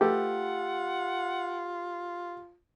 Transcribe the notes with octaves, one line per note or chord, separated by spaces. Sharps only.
A3 F4 G4 A4 B4 F#5